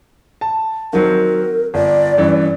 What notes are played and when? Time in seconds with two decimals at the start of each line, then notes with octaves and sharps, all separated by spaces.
0.41 A5
0.93 D#3 F#3 C4 A#4
1.74 G1 D5
2.18 G2 E3 C#4